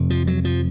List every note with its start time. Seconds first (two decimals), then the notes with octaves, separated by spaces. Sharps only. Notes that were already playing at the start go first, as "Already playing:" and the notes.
Already playing: F2 C3
0.10 F3
0.27 F#3
0.45 F3